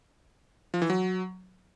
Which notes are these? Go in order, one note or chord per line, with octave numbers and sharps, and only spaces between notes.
F3
E3
F#3